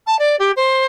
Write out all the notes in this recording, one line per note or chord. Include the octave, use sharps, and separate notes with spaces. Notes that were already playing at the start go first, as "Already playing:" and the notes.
A5
D5
G4
C5